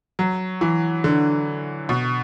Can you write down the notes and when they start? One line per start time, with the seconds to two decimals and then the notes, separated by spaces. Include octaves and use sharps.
0.19 F#3
0.61 E3
1.04 D3
1.89 B2